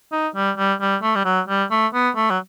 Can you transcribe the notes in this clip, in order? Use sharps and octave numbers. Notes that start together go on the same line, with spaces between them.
D#4
G3
G3
G3
A3
G3
F#3
G3
A3
B3
A3
F#3